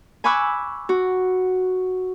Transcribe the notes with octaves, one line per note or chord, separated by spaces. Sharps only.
G#5 B5 C#6 D6 E6 F#6
F#4